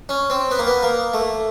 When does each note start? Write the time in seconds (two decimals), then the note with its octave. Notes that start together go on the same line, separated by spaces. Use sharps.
0.09 C#4
0.30 C4
0.51 B3
0.59 A#3
0.67 B3
0.83 A#3
1.13 A3